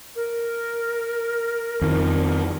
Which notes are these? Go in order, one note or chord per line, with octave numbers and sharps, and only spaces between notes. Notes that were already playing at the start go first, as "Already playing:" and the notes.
A#4
F2 D#3 F3